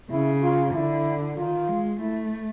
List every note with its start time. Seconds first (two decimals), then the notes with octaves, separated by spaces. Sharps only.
0.11 C#3 E4
0.42 F4
0.74 D3 E4
1.37 D#3 F4
1.68 G#3
1.99 A3 E4